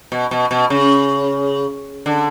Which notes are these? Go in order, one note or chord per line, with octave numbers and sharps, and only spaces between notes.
B2
B2
B2
C#3
D3